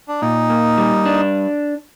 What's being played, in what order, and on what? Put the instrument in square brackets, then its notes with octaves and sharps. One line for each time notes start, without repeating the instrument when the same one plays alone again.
[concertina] D4
[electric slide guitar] A#2 [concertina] D#4
[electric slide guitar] A#3
G3
D4